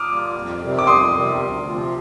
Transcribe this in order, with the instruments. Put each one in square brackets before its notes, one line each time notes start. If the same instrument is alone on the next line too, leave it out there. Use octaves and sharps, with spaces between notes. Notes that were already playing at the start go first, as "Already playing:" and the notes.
Already playing: [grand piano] D6 D#6 F6
[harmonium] G3 A#3 F4
F2
C3 D#3 G3 C4
[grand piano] D6
[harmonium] F2 [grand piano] C6 D#6
[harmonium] C3 D#3 G3 C4
D2
C3 F3 C4 F4